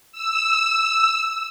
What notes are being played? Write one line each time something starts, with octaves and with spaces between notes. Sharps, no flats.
E6